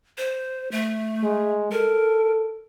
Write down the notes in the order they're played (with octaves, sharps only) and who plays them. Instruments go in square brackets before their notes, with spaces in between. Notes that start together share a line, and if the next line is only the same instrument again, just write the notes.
[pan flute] C5
A3
[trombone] G#3
[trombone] A4 [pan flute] A#4